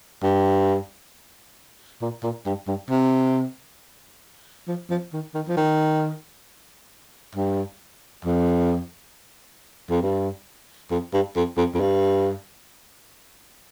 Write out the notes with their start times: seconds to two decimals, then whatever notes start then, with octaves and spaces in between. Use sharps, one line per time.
0.23 G2
2.02 A#2
2.23 A#2
2.46 G2
2.68 G2
2.90 C3
4.68 F3
4.90 F3
5.13 D#3
5.35 D#3
5.48 F3
5.57 D#3
7.35 G2
8.25 F2
9.91 F2
10.02 G2
10.91 F2
11.14 G2
11.36 F2
11.58 F2
11.75 F2
11.80 G2